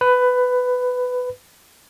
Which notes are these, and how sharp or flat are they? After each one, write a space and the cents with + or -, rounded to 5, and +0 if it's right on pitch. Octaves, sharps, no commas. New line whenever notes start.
B4 +15